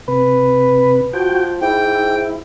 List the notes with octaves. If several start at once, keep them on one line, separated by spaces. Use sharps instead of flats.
C3 B4
F3 F#4 G5
G#2 E4 G5